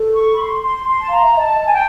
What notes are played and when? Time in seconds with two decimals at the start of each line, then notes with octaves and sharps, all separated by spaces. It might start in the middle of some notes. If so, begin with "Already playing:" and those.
Already playing: A4
0.14 C#6
0.34 B5
0.39 C6
0.63 C6
0.88 C6
1.01 A5
1.09 F5 A#5
1.23 E5
1.36 D#5 A5
1.67 G#5
1.73 G5